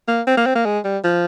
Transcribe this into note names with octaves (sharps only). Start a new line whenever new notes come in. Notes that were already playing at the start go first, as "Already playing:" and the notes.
A#3
C4
A#3
C4
A#3
G#3
G3
F3